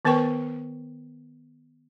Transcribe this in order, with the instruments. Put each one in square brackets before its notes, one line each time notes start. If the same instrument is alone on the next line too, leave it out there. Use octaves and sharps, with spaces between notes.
[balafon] D#3 B3 A#4 B4 G5 C#6